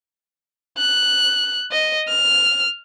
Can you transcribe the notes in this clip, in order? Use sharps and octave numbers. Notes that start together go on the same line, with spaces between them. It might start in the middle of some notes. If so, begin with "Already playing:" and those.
F#6
D#5
F6